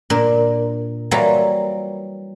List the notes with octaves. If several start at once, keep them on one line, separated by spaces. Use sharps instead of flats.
A#2 D4 A#4
E3 F#3 G3 A#3 E4 F4